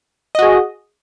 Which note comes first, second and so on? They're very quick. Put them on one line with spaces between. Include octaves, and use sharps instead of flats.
D#5 F#4 G#4